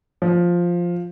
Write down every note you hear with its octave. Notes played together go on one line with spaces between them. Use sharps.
F3